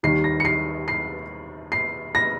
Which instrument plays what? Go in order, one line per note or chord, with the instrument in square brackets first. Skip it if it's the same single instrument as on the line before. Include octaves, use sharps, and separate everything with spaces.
[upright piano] D#2 D#3 G3 C7
A#6
C#7
C7
C7
C7
A#6